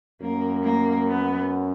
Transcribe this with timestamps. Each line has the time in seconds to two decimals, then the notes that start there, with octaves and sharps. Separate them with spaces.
0.21 F#2 A#3
0.63 A#3
1.06 B3